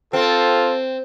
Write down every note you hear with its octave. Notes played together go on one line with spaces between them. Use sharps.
C4 F4 A4